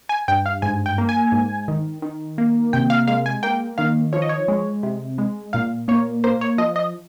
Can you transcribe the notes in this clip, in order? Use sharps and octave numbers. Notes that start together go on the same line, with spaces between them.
G#5
G2 G5
F5
G#2 G#5
G5
A#3
G#5
G#2
D#3
D#3
A#3
C3 G5
F5
G#3 F5
G#5
A#3 G5
D#3 F5
F3 C#5
D#5
C#5
G#3
C3
G#3
A#2 F5
A#3 C#5
A#3 C5
C#5
F3 D#5
D#5